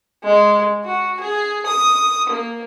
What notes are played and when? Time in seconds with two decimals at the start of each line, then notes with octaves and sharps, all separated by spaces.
0.24 G#3
0.84 F#4
1.20 G#4
1.66 D#6
2.29 A#3